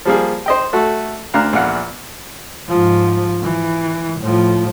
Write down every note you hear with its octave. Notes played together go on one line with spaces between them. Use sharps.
F3 G3 A#3 G#4
C5 D#5 G5
A3 F#4 A4
D2 D4 F5 A#5 F#6
A#1 E2 F5 F#5
G#2 F3
E3
A2 F3